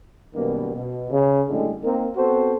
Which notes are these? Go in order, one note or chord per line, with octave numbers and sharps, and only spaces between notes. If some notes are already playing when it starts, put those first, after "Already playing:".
F#2 B2 D#3 G3 A#3 B3
B2
C#3
F#2 A2 D3 G3 G#3
A#3 C4 D#4 A#4
B3 C4 F#4 A4 C5